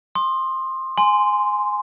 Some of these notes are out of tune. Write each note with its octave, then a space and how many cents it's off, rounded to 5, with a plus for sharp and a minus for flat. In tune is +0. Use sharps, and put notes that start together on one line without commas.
C6 +15 D#6 -35
G#5 +0 C6 -10